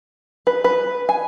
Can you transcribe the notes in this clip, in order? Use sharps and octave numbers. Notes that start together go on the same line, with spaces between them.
B4
B4
G#5